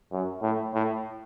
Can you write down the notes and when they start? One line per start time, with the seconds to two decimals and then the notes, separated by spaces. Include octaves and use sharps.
0.12 F#2
0.42 A2
0.74 A2